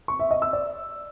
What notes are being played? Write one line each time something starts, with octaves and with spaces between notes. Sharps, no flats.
C#6
E5
D#5
E6
D5